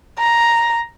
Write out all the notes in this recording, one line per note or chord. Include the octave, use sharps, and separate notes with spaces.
A#5